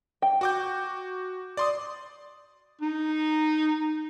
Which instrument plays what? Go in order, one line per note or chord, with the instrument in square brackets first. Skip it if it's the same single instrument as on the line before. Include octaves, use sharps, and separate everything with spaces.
[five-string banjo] G5
[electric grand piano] F#4 D6 G6
D5 C6 D#6
[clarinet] D#4